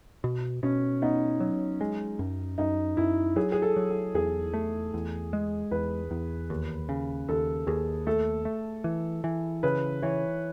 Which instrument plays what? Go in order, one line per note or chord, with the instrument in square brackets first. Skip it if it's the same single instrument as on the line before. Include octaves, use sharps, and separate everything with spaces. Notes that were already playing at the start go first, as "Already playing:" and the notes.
[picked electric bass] B2
[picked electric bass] B2 [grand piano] C#4
[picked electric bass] B3 [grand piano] D#4
[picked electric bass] F#3
G#3
F#2
[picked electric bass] F#2 [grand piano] D#4
[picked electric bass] F#2 [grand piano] E4
[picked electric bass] F#3 [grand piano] G#4
[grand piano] G#4
A4
[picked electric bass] F#3
[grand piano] A4
[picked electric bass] E2 [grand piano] G#4
[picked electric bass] A3
E2
G#3
[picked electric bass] E2 [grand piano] B4
[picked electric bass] E2
D#2
C#3
[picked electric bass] D#2 [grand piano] A4
[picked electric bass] D#2 [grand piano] G#4
[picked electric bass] A3 [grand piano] A4
[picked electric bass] A3
E3
E3
[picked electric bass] C#3 [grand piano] B4
[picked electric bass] E3 [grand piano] C#5